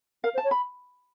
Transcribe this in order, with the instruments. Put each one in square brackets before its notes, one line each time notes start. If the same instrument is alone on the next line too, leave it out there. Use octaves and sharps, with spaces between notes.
[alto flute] A#4 [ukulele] F5
[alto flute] C5
[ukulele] A5
[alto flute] C#5
[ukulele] B5